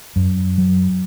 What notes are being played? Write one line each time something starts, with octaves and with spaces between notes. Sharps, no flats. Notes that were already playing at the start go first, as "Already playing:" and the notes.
F#2
F#3